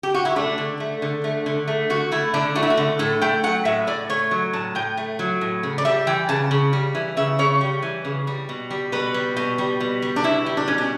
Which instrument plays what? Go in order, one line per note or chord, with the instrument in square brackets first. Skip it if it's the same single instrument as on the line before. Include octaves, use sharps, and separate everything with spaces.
[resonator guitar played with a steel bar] G4
F#4
E4
A3 D4
D3
A3
D3
A3
D3
A3
D3 F#4
A3 E4
D3 D4
A3 F#4
E4
F#4
D3
A2 A4
A3 G5
F#3 F#5
A2 E5
A2 D5
A3 C#5
F#3
A2 A5
A2 G5
A3
F#3
A2
C#3
D5
G3 E5
E3 G5
C#3 A5
C#3
G3
E3
C#3 E5
C#3 C#5
G3
E3
C#3
G3
B2
G3
B2 B4
G3
B2
G3
B2
G3
D4
B2 E4
G3
D4
B2 C#4
D4